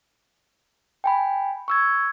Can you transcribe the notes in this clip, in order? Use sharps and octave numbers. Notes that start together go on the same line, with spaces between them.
G5 G#5 B5
C#6 E6 G#6